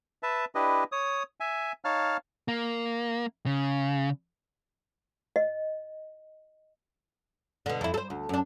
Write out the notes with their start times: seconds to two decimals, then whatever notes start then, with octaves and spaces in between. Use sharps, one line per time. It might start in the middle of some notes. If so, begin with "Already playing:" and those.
0.23 B4 E5 A5
0.55 D4 E4 G4 B4 D#5
0.92 C#5 D#6
1.40 E5 G#5
1.85 D#4 C#5 F5 A5 F6
2.48 A#3
3.46 C#3
5.36 D#5
7.66 B2 D3
7.81 F2 E4
7.94 A4 C5
8.10 D2
8.29 F#2 D4